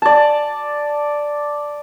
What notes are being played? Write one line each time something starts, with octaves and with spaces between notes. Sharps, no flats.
D5 A5